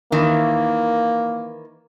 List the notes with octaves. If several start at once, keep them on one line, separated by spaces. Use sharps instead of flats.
D#3 E3 A#3